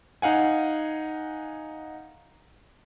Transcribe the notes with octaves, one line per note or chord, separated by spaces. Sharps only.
D#4 F5 F#5 G#5